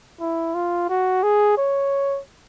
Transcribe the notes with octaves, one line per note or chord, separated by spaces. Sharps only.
E4
F4
F#4
G#4
C#5